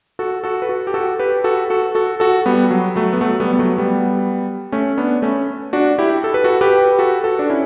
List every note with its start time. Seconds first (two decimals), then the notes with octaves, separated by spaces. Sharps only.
0.19 F#4 A4
0.44 F#4 A4
0.62 B4
0.69 F#4 A4
0.87 G4
0.94 F#4 A4
1.19 G4 B4
1.44 F#4 A4
1.70 F#4 A4
1.95 F#4 A4
2.20 F#4 A4
2.46 G3 B3
2.71 F#3
2.96 F#3 A3
3.13 B3
3.21 F#3 A3
3.40 G3 B3
3.53 B3
3.59 F#3 A3
3.78 G3 B3
4.72 A3 C#4
4.97 B3 D4
5.22 A3 C#4
5.73 D4 F#4
5.98 E4 G4
6.24 A4
6.34 B4
6.44 F#4 A4
6.61 G4 B4
6.99 F#4 A4
7.24 F#4 A4
7.39 D4
7.50 C#4 E4